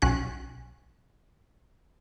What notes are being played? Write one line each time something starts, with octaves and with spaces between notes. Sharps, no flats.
B1 C#4 F#6